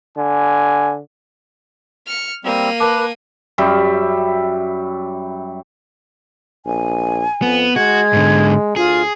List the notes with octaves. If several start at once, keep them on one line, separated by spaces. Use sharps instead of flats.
D3 G#5
F6 C#7
G3 A#3 C4 D#7
A#4 B4 A5 D6
F#2 G3 E5
A#1 G#5
F2 B3
G#3 F#4 G#6
G#2 D3
D2 F4 G#4